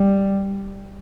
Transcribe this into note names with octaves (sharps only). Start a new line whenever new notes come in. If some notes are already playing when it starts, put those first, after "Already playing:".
Already playing: G3